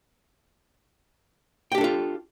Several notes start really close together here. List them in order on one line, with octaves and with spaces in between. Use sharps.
G5 G4 D4 A4 F4